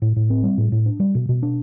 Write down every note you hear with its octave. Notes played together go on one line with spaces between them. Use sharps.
A2
A2
C4
G3
A2
A2
D4
G3
B2
B2
D4